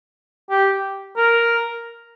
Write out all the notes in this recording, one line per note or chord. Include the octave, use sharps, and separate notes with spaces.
G4
A#4